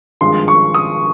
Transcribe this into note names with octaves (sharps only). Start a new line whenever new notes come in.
G#1 G2 F3 G#3 C6
C#6
D#6